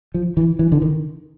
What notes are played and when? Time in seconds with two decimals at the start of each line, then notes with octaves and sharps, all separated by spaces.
0.14 F3
0.37 E3
0.59 E3
0.72 D3
0.82 D#3